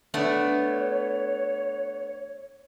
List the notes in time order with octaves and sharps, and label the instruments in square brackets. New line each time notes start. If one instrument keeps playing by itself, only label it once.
[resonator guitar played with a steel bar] A3 B3 D4 [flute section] C#5